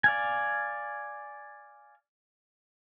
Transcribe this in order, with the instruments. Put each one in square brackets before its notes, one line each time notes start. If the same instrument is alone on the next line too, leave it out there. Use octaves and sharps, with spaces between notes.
[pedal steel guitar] D5 F5 G#5